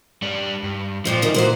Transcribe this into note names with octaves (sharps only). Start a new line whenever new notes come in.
G3 D4
G2
F2 A#2 F3 C4
A#2 D#3
A#2 E3 F#4 C5